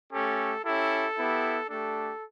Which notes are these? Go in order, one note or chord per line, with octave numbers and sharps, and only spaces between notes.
A3 C#4 G4 A4
C#4 E4 G4 A4
B3 E4 G4
A3 D4 G4 A4